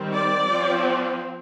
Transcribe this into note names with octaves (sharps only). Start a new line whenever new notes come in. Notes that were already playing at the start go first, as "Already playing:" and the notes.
Already playing: D#3 G3 C4
D5
F3 C4